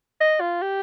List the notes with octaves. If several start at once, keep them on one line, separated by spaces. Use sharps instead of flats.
D#5
F4
G4